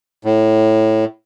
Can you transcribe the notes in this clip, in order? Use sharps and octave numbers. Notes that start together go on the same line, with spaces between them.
A2